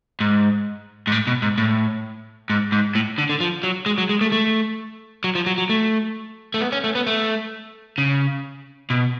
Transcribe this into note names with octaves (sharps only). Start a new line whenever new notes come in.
G#2
G#2
A2
B2
G#2
A2
G#2
G#2
A2
D3
D3
F3
F#3
G#3
F#3
G#3
A3
A3
F#3
F3
F#3
F#3
A3
A3
B3
C#4
A3
B3
A3
C#3
B2